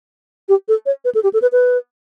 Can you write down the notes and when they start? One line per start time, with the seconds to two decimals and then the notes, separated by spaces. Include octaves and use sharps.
0.49 G4
0.68 A4
0.86 C#5
1.05 B4
1.15 A4
1.24 G4
1.33 A4
1.42 B4
1.52 B4